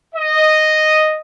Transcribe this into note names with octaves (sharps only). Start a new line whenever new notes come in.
D#5